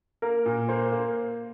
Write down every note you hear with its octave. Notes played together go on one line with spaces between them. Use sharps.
A#3 A#4
A#2
A#3 C5
A#3